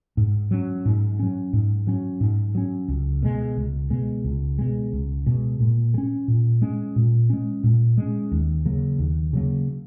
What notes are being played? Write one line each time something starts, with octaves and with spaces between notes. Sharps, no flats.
G#2
F#3 C#4
G#2
F#3 C#4
G#2
F#3 C#4
G#2
F#3 C#4
C#2
B2 G#3
C#2
B2 G#3
C#2
B2 G#3
C#2
B2 G#3
A#2
G#3
C#4
A#2
G#3 C#4
A#2
G#3 C#4
A#2
G#3 C#4
D#2
C#3 F#3 A#3
D#2
C#3 F#3 A#3